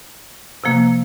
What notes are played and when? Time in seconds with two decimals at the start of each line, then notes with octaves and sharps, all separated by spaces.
0.64 C3 F3 A#3